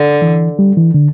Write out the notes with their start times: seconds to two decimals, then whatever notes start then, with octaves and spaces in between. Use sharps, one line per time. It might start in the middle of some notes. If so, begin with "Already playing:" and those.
Already playing: D3
0.22 E3
0.59 G3
0.77 E3
0.94 D3